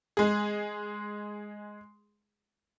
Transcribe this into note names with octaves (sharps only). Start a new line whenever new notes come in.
G#3 G#4